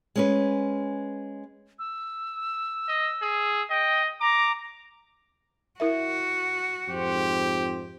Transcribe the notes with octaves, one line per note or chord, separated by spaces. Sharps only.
G#3 C#4 B4
E6
D#5
G#4
D#5 G5
A#5 D6
E4 F#4 A#4 E5
F2 G#2 G4 C5